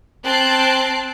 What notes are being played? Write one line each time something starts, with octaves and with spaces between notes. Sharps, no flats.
C4 A5 F#6 C7 D7